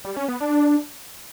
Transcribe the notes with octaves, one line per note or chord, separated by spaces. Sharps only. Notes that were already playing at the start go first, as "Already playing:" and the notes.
G3
C#4
B3
D4